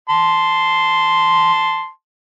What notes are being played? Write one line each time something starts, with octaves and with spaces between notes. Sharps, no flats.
A5 C6